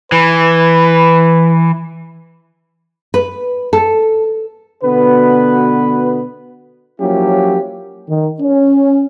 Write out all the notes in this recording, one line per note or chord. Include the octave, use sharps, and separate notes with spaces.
E3 B4
B4
A4
B2 D3 B3 F#4 B4
F3 F#3 A#3 C#4 E4 G4
D#3
C#4